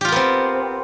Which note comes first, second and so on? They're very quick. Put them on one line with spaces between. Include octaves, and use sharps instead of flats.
G4 F4 A#4 B3 C4